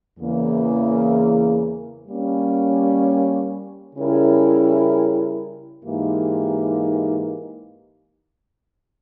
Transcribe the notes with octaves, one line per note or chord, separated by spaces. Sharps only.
E2 C#3 E3 A#3
G3 A#3 C#4
C#3 G3 C#4 E4 A#4
G#2 E3 A#3 D#4 G4